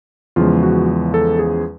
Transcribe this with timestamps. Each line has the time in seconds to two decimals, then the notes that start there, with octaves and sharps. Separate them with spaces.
0.36 E2 C#3 F3 G#3 F4
0.63 F#4
1.14 A4
1.39 G#4